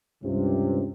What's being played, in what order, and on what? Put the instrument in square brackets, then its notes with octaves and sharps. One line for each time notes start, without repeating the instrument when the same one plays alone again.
[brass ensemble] C#2 G2 C3